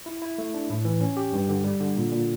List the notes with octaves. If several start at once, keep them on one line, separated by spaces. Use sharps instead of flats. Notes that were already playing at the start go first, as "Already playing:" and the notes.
E4
E4
A3
D4
A2
E3
C#4
G4
G2
D3
G3
D3
A#2
A#2